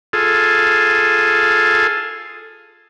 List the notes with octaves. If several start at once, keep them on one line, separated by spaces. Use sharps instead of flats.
F4 G#4 A4